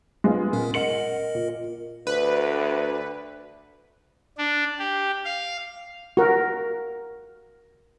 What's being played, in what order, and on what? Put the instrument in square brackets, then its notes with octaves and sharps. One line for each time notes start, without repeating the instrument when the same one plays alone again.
[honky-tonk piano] G#3 B3 F4
[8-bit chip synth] A#2 C#4 A#4
[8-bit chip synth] A#4 D#5 [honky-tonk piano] F#5 C#7 F#7
[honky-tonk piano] A#2
[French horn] D2 [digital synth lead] B4
[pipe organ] D4
G4
F5
[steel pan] F#4 A#4